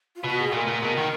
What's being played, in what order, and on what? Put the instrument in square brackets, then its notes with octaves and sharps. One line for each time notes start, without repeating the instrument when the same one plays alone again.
[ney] F4
[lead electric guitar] B2 [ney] F#4
[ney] G#4
[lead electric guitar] A#2 [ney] A#4
[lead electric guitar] A#2
B2
D#3